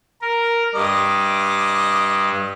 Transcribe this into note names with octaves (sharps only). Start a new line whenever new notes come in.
A#4
G2 D#5 D6